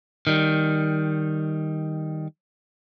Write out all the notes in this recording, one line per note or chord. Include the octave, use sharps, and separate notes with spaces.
D#3 G3